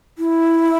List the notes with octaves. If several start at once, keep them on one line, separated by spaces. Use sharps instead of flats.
E4